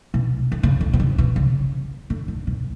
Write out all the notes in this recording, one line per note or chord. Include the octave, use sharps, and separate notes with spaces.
B2
D3
C#3
D3
B2
C#3
B2
C#3
D3
D3
B2